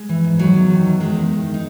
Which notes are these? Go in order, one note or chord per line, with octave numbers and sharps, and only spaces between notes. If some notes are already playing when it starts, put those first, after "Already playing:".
Already playing: G#3
E3
G#2
D#3 F#3
E2
D#3
E2
D#3 G#3
E2
D#3
D#4